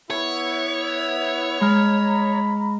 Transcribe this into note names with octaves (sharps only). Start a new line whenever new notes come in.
B3 E4 C#5
G#3 A#5 B5 F6